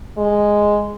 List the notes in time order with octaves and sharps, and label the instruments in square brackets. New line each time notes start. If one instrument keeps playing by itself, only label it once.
[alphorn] G#3